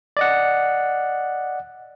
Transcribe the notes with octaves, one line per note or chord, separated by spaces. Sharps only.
D5 D#5 F#5